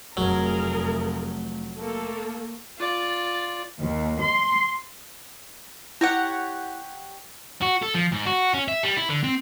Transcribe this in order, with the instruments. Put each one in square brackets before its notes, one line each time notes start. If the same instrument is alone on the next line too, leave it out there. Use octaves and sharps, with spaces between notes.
[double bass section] F1 A3 [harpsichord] F#3 [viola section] G#4 A#4
[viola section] A3 A#3 A4
[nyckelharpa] F4 D5
[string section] D#2
C6
[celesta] E4 A#6 [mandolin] G4 C#5 F#5
[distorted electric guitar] F#4
A4
F3
G#2
F#4
C#4
E5
G3
E4
D3
C4